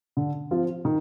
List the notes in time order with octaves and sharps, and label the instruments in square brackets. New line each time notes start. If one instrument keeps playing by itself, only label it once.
[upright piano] D3
F3 C4 F4
D#3